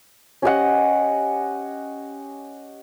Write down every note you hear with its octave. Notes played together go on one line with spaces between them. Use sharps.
C#4 G4 D#5 F#5